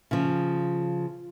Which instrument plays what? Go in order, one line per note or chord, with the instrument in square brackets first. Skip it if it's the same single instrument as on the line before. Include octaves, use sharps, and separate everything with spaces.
[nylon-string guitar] C#3 F3